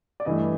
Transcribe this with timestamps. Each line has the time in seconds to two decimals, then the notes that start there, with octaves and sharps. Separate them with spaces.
0.20 D5
0.25 G2 E3 A3 D#5